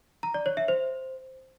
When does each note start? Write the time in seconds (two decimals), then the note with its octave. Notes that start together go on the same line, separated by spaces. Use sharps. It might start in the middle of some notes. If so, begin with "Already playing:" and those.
0.23 A#5
0.34 D5
0.46 C#5
0.57 E5
0.68 C5